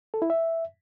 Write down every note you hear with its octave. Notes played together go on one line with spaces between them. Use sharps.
A4
E4
E5